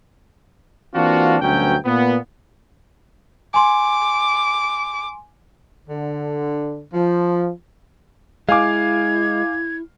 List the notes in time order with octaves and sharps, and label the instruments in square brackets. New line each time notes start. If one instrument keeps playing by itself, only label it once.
[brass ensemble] E3 A#3 C4 D4 F4 F#4
D2 G2 B2 F#3 C#4 G5
A#2 B3
[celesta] G#5 C6 [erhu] D6
[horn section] D3
F3
[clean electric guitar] G#3 [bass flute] E4 [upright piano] F5 G#5 D6 [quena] G#6